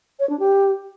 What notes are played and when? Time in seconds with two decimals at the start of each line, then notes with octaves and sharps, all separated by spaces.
0.20 C#5
0.30 D4
0.39 G4